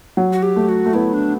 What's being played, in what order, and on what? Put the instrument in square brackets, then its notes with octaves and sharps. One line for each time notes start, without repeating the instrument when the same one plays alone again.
[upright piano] F#3
[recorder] F#4
G4
[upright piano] A3
[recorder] F#4
[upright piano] A3
[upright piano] B3 [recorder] E4
[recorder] D4